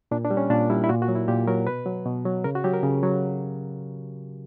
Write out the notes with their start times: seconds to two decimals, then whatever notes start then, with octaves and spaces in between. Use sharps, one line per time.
0.11 A#2 D4
0.25 D4
0.31 G3
0.37 C#4
0.50 A#2 D4
0.70 G3 E4
0.84 E4
0.89 A#2 F#4
1.02 F#4
1.08 F#3
1.15 E4
1.28 A#2 G4
1.48 F#3 A#4
1.67 B2 B4
1.86 F#3
2.06 B2
2.25 F#3
2.44 C#3 A#4
2.55 F#4
2.64 F#3 G4
2.73 A#4
2.83 C#3
3.03 F#3